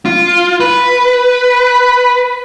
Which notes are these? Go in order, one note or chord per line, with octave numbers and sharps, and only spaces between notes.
F4
B4